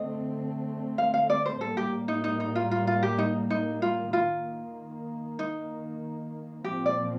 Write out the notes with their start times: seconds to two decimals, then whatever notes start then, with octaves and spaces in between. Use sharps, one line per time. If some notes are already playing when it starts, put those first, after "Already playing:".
Already playing: D3 A3 C4 D#5
0.98 F5
1.14 F5
1.30 D5
1.46 C5
1.61 A2 G3 A#3 A4
1.77 G4
2.08 D#4
2.24 D#4
2.40 D#4
2.55 F4
2.71 F4
2.87 F4
3.03 G4
3.18 D#4
3.50 D#4
3.82 F4
4.13 D#3 A#3 F4
5.39 D#4
6.64 A#2 F3 C4 G4
6.86 D5